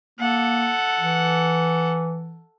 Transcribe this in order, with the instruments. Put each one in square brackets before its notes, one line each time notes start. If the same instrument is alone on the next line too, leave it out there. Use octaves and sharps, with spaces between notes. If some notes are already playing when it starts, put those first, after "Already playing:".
[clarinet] A#3 [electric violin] A4 F#5
[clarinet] E3